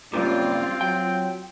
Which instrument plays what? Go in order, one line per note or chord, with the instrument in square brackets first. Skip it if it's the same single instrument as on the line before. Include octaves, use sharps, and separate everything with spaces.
[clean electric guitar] C#2 F#2 A#2 [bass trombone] G3 [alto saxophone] C4 [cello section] F4
[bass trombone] F#3 [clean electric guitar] G5